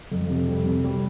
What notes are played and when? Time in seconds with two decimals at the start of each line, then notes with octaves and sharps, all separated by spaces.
0.12 F2
0.30 C3
0.48 G3
0.66 C3
0.84 G3